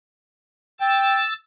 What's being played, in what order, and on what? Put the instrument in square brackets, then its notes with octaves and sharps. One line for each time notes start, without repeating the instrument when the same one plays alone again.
[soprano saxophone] G5 [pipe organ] E6 A6